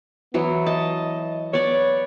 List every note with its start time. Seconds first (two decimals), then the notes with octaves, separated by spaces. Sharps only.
0.34 E3 F#3 B3
0.66 D#5 A5
1.53 B3 C#5 D5